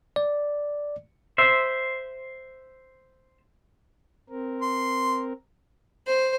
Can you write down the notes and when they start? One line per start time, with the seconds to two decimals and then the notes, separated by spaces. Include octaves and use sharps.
0.16 D5
1.38 C5 E5
4.29 C4 A#4
4.62 C6
6.07 C5